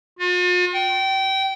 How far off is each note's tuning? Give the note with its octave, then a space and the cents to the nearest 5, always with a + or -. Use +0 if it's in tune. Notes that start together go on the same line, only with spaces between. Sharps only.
F4 +45
G5 -25